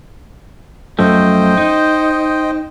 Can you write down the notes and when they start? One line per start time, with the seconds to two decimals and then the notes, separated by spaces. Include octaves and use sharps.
0.99 F#2 F3 A3 C5 D#5 G5
1.57 D#4